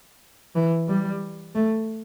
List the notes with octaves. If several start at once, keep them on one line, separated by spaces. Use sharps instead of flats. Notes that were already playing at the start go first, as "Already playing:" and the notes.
E3
G3
A3